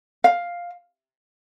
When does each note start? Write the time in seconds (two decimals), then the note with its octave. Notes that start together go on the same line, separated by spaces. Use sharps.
0.24 F5